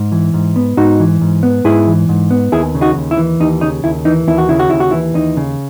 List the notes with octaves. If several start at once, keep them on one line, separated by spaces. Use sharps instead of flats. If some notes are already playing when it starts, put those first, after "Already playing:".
Already playing: G#2
E3
G#2
B3
G#2 D#4 F#4
E3
G#2
B3
G#2 E4 G#4
E3
G#2
B3
D#2 E4 G#4
C#3
D#4 F#4
D#2
E4
E3
D#2 D#4
C#3 D#4
D#2 E4
E3 D#4
D#2 E4
F#4
C#3 E4
F#4
D#2 E4
F#4
E3 E4
D#2 D#4
C#3